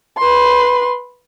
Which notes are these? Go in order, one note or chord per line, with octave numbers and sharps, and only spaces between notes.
B4 C6